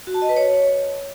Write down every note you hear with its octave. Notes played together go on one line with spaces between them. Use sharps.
F#4
A5
D#5
B4
C#5